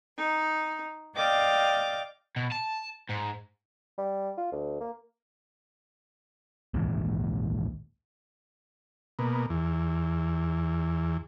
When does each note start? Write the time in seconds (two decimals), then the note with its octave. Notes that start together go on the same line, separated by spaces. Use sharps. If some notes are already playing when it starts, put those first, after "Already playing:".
0.17 D#4
1.16 D5 D#5 F5 G5 D6 F6
2.36 B2
2.52 A5
3.09 G#2
3.98 G3
4.38 F4
4.52 D2
4.81 A#3
6.74 A#1 D#2 G#2 E3
9.19 B2 A#3
9.50 E2